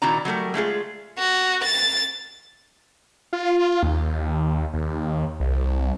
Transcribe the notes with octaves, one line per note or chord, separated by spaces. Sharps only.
A#2 D#3 E4 F#4 D5 A#5
F#3 G3 A3 A#4
G#3 A3 F4 G#4
F#4
A6
F4
D#2
D#2
C2